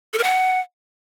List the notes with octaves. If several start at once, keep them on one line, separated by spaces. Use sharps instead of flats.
A4
A#4
F#5